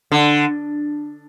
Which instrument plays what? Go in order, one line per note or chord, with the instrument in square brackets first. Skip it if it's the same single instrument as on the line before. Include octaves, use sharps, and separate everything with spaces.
[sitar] D3